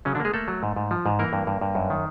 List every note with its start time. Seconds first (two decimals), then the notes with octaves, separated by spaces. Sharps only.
0.05 C#3 F#3 C#4
0.15 D3 D4
0.20 A#3
0.25 G#3 G#4
0.34 A3 A#3 A4
0.48 F#3
0.63 G#2
0.76 G#2
0.91 F3
1.06 G#2
1.19 E3 A#3 A#4
1.33 G2
1.47 G2
1.61 G2
1.75 F#2
1.90 D#3